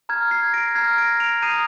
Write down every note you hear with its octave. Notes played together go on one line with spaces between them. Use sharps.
A#5 F6 G#6
G#6 C7
A#6 D7
A#5 F6 G#6 C7
A#6 D7
D7 F7
A#5 D#6 G6 C7 D#7